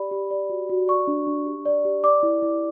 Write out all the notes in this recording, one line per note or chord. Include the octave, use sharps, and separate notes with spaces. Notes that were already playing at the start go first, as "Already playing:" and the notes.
Already playing: G4 D5 B5
G4
D5
F#4
F#4
D5 C#6
D4
D4
G4
D5
G4
D5 D6
E4
E4